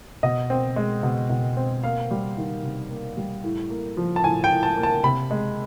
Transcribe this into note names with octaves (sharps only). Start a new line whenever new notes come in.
B2 D#5
C4
G#3
B2
B2
C4
A#3 F5
G3
D#3
C3
A#3
G3
A2
A#3
F3
A5
A2 G#5
G5
A2
A5
A#3
A5
C3 B5
G#3